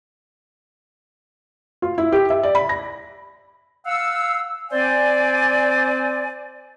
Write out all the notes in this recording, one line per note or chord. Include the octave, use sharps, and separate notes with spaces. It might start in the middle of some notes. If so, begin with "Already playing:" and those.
F4
E4
G4
E5
D5
B5
A#6
F5 F#5 E6
C4 C5 D5 G#5